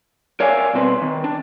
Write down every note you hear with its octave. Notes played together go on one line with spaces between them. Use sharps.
A#4 C#5 D5 E5 F5 G#5
C2 B2 C4 B4
D#3
D4